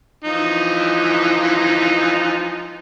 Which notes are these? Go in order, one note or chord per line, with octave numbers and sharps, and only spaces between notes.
E3 F3 D#4